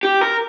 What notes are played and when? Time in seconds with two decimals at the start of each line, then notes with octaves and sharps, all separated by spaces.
0.03 G4
0.21 A#4